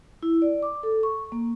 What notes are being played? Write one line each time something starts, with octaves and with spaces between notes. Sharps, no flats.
E4
D5
D6
A4
C#6
A#3